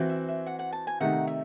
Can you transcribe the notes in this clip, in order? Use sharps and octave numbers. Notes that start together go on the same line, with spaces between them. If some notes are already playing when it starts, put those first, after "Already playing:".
Already playing: E3 C4 F#4
E5
E5
F#5
F#5
A5
G#5
C3 D#3 A3 D#4 F#5
E5